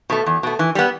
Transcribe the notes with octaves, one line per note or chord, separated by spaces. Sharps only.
B2 A3
E2
B2 A3
E3
G3 B3